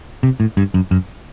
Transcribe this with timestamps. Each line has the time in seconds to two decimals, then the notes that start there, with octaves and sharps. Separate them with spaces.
0.23 C3
0.40 A2
0.57 G2
0.74 F#2
0.91 F#2